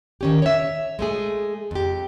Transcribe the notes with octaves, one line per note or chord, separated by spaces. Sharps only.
D#3 C#4 G4
C#5 E5
G#3 A3 G#4
F2 G4